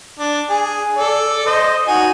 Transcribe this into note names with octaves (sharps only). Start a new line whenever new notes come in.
D4
G#4
A4 D5
C5 D#5
D#4 F#4 G#5